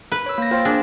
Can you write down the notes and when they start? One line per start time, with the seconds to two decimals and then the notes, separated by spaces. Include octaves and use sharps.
0.12 B4
0.26 C#5 E6
0.38 A#3 A#6
0.51 F4 C5 G5
0.65 D4 G#4